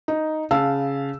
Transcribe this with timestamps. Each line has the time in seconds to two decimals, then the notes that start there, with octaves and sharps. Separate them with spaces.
0.08 D#4
0.51 C#3 F5 A5 E6